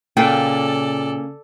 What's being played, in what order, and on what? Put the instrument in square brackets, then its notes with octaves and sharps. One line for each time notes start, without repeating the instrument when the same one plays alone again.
[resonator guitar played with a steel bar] A#2 G5 [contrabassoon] C#3 [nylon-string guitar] A#3 C#4 F5 [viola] A4 D5